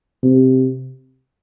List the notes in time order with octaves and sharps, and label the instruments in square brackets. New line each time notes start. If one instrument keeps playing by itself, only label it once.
[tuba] C3